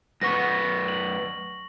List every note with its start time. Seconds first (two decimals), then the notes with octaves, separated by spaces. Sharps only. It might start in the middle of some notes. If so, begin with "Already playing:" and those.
0.21 F#2 B4 F#5 C#6 A#6
0.88 F#7